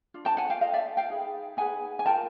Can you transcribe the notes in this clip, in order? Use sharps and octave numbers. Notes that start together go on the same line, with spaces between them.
D4 F4
G5 A5
F#5 G#5
F5 G5
F4 A4 D#5 F5
D5 E5
F5 G5
D#4 G#4 B4
D#4 G#4 B4 F#5 G#5
G#5
F4 A#4 G5 A5